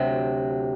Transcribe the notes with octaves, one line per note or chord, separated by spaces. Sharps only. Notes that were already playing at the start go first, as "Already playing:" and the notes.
Already playing: D2 C3 F#3